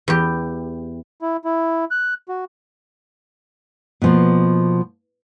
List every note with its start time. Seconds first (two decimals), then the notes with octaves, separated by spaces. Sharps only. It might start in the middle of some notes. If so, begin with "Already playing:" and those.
0.08 E2 G4
1.22 E4
1.45 E4
1.91 F#6
2.29 F#4
4.02 B2 F3 A#3